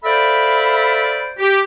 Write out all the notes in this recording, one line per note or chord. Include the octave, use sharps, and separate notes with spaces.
A4 C5 D5 E5 F5 B5
G4